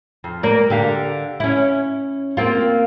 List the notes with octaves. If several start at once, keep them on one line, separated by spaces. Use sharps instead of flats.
F2
A#3 D5
D3 G4 F5
C#4 E4
A#3 C4 F4